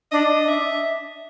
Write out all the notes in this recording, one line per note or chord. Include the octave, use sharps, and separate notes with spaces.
D4 D#5
D4 E5